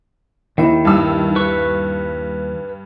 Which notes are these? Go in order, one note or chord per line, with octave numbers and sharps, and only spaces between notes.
D#2 D#3 E4
G2 E6
B4 C#6